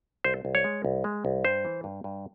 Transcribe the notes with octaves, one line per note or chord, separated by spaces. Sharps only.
C2 C5
C2
C#5
G#3
C2
G#3
C2
G2 C5
E3
G2
G2